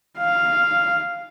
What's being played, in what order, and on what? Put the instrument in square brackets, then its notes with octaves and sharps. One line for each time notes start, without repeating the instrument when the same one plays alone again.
[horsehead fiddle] F5